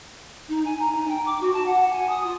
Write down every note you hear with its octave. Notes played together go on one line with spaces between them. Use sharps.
D#4
G#5
A#5
D#4
G5
D6
F#4
A5
F#5
G#5
D#6
F4